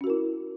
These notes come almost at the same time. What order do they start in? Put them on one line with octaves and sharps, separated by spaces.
C#4 F#4 A#4 E4